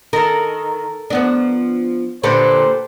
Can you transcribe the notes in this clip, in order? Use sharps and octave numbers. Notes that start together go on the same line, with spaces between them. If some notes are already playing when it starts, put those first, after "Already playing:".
D#3 A4 A#4
F3 B3 D4
A#2 D3 G4 A4 B4 C5